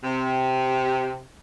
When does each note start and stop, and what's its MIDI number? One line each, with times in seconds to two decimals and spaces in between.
0.04 1.23 48